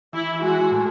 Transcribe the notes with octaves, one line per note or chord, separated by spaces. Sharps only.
E3 E4
G#3 F#4
A2